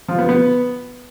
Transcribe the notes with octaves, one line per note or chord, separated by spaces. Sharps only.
F3
B3
B3